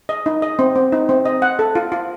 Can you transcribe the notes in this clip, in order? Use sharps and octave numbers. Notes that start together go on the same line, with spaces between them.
D#5
D#4
D#5
C4
C4
D#4
C4
D#5
F#5
A4
F4
F4